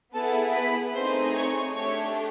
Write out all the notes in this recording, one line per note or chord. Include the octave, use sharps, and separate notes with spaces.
B3 E4 G#4 A4 A5
B4 B5
A3 C4 D#4 G#4 C5 C6
C#5 C#6
A3 D4 G4 C#5 C#6